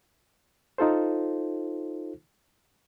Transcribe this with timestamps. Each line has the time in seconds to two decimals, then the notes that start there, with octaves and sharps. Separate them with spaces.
0.78 D#4 F4 A4 C5